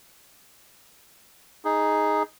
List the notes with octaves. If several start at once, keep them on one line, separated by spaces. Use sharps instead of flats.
D#4 G#4